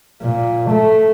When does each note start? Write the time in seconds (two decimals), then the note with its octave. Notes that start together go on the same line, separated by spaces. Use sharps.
0.22 A#2
0.70 A3